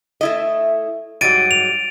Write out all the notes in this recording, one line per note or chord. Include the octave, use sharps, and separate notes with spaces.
A3 E4 D#5
G#2 F#3 G3 A6 D7 D#7
F7